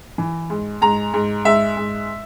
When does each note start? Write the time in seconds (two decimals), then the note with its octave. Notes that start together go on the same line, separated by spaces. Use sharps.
0.18 E3
0.50 G#2
0.82 G#2 A#5
1.14 G#2
1.45 G#2 E5
1.77 G#2